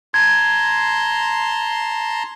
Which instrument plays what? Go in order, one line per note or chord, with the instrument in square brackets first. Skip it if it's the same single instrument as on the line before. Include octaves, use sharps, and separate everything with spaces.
[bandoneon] A5 A#5 C6 [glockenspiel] G#6